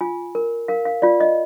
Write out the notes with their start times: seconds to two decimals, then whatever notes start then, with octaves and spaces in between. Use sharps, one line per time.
0.01 F4 G#5
0.35 A#4
0.68 A#4 F5
0.85 F5
1.02 F4 D5
1.20 D#5